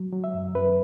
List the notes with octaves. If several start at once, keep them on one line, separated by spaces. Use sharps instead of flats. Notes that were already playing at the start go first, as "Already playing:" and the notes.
Already playing: F#3
F#3
E5
F#2
F#2 B4